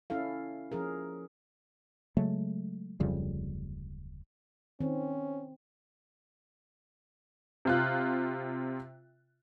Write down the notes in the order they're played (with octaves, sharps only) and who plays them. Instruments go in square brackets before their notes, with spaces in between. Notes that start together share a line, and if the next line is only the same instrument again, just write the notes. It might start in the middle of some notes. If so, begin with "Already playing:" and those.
[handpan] C#4 E4 A4 F5
F3 C#4 G#4 A#4
[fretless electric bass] C#3 F#3 G#3 A3
D1 F2 C#3 G3
[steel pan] D#3 [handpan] C4 [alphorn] C#4
[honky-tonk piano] C3 F4 F#6